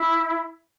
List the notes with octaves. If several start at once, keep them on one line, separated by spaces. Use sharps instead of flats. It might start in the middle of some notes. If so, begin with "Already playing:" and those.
Already playing: E4